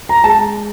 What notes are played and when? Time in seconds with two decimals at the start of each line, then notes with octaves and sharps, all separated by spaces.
0.09 A#5
0.24 G#3 A5